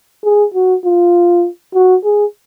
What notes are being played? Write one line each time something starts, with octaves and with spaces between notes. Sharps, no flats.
G#4
F#4
F4
F#4
G#4